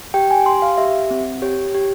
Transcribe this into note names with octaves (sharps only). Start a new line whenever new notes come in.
G4 G5
G#5
G4 C6
F5
G4 E5
C4
G4 C#5
G4